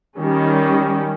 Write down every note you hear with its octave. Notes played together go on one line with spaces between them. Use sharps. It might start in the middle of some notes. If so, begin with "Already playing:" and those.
D#3 G3 C#4